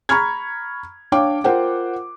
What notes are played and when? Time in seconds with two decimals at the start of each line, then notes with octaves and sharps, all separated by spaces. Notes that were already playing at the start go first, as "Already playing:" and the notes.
0.09 A#5 B5 C#6 F6 G#6
1.12 D4 C#5 F5 G5 D6
1.44 F4 A#4 C5 F#5 G5